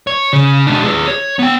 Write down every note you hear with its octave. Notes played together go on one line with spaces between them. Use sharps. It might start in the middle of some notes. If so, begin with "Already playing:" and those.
C#5
C#3
G#3 D4
G#4 B4
C#5
B3 G5